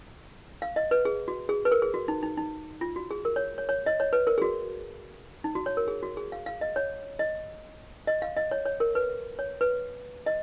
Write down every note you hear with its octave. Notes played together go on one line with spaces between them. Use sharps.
F5
D#5
B4
G#4
F#4
G#4
B4
A#4
G#4
F#4
D#4
D#4
D#4
F4
F#4
G#4
A#4
C#5
C#5
C#5
D#5
C#5
B4
A#4
G#4
F#4
D#4
F#4
C#5
A#4
G#4
F#4
G#4
F5
F5
D#5
C#5
D#5
D#5
F5
D#5
C#5
C#5
A#4
B4
C#5
B4
D#5